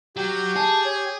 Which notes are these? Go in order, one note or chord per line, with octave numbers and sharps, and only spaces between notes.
F#3 G4
G#4 A5
C#5